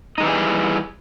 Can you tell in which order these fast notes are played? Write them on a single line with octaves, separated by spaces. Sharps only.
D#4 G#3 E3 G3 G#4